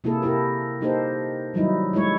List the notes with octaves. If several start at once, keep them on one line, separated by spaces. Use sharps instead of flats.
C3 A#3 E4 G#4 A4
C3 E4 G4 A#4
A#3 D#4 G4 A4 A#4 C5
D#3 F#3 G3 D#4 E4
G#3 A3 E4 C#5